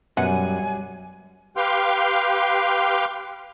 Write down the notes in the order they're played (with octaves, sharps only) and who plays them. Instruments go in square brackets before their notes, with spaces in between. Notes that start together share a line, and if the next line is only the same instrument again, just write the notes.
[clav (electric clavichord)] F#2 [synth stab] B2 F#5 D#7 [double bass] F#3 G3 [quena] G#5
[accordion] G4 B4 F5 G5 C6 F6